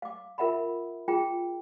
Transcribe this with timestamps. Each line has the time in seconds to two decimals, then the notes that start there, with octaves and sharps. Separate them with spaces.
0.02 F5 D6
0.38 F4 A#4 E5 F#5 A#5 B5
1.08 F4 G#4 G5 A#5